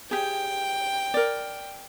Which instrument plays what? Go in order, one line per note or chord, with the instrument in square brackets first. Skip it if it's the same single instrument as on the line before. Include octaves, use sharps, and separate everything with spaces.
[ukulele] G4 G#4 [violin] G5
[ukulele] A#4 D5